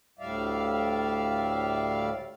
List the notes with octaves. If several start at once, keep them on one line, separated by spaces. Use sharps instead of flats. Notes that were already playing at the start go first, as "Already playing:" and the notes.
D2 A2 G3 D5 E5 F5